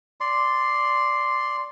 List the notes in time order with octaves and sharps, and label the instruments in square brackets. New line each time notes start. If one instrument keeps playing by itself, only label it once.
[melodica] D5 C6